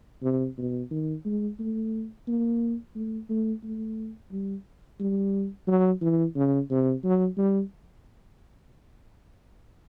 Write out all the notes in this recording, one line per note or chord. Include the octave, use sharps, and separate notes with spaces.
C3
B2
D#3
G#3
A3
A#3
A3
A3
A3
G3
G3
F#3
E3
C#3
C3
F#3
G3